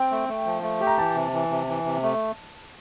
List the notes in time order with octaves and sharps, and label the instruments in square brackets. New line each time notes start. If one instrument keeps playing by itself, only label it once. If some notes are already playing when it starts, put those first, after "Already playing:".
Already playing: [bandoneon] C4 [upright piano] G5
[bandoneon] A3
A3
F3
A3
G4
[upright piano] A#5
[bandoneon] E3 [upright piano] A5
[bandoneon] C3
E3
C3
E3
C3
A3